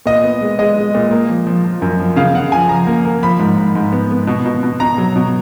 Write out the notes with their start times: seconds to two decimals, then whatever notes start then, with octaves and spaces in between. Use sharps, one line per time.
0.06 A#2 D#5
0.23 B3
0.41 G#3
0.59 G#3 D#5
0.77 G#3
0.95 A#2
1.11 A#3
1.29 F3
1.47 F3
1.64 F3
1.82 F#2
2.00 F3
2.16 C#3 F5
2.34 C#3 F#5
2.52 F3 G#5
2.69 F3 A#5
2.87 A#3
3.05 A#3
3.23 F3 B5
3.39 G#2
3.57 G#2
3.75 G#2
3.92 B3
4.11 B3
4.27 B2
4.46 B2
4.63 B2
4.80 B2 A#5
4.98 F#3
5.16 B2